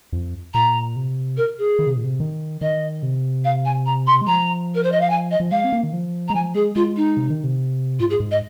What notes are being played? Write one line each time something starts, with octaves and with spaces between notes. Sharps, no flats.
F2
A#2 A#5
C3
A#4
G#4
D#3
C3
A#2
C3
D#3
D#3 D#5
C3
F5
G#5
A#5
C6
G#3
F3 A#5
A#4
C5
D#5
F5
G#5
D#5
F3
G#3 F5
C4
A#3
D#3
F3
G#3 A#5
F3 G#5
G#3 G#4
G#3 F4
D#4
C3
D#3
C3
G#2 F4
G#4
G#2
D#5